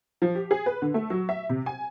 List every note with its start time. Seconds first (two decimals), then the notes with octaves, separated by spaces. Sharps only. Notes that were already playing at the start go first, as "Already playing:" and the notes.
0.22 F3
0.35 G4
0.51 G#4
0.66 B4
0.82 D3
0.94 A3
1.10 F#3
1.29 E5
1.49 C3
1.66 G#5